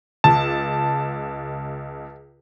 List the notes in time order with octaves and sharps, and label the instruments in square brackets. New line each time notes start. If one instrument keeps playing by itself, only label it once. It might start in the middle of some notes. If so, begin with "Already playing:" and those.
[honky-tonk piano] C#2 [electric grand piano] A5